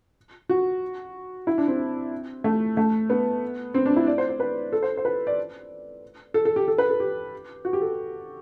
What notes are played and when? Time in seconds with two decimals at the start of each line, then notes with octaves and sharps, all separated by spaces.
0.49 F#4
1.47 E4
1.58 D4
1.68 C4
2.44 A3
2.77 A3
3.10 B3
3.74 C4
3.86 D4
3.96 E4
4.07 D5
4.18 C5
4.29 C5
4.40 B4
4.73 A4
4.83 C5
4.97 C5
5.05 B4
5.27 D5
6.34 A4
6.45 A4
6.56 G4
6.68 A4
6.78 B4
6.90 A4
7.00 G4
7.65 F#4
7.73 G4
7.81 A4